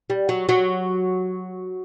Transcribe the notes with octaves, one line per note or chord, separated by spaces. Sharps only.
G3
F#3
F#3